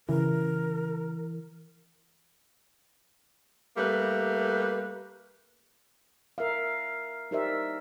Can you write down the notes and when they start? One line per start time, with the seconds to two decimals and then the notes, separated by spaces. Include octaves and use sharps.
0.09 C#3 E3 A#4
3.77 G3 A3 A#3 B4
6.38 A#4 E5 F5
7.31 D#4 G4 A#4 C5 D5 E5